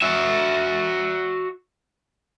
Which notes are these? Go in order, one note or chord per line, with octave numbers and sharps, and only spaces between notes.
F#4 E5